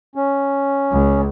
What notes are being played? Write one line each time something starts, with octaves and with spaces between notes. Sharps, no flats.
C#4
C#2